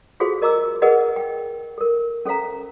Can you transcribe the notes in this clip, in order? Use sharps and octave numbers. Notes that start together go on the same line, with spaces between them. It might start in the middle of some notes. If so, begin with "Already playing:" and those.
F4 F#4 G#4 A4 C5 F5
A#4 D#5 A#5 D6 E6
G#4 A#4 B4 D#5 F#5
G5
A4 A#4
C#4 A4 C5 F5 A#5